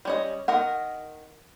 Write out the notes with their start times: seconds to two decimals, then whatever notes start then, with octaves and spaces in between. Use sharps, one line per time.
0.05 G3 C#4 D#5
0.48 D#3 A#4 D#5 F#5